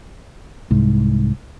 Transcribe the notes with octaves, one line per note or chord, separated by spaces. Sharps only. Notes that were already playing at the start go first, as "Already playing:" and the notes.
C2 G#2